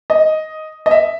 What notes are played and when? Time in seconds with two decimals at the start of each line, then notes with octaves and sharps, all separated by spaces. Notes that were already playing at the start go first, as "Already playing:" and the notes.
0.10 D#5
0.86 D#5
0.91 E5